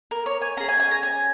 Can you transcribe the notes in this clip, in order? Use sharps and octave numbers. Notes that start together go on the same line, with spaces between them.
A#4
C#5
G#5
C#4 G#4 A#5
G#5
G#5
A#5
G#5